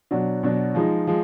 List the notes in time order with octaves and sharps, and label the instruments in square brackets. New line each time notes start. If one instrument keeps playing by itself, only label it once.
[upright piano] B2 F#3 D4
B2 F#3 D4
F3 G#3 D#4
F3 G#3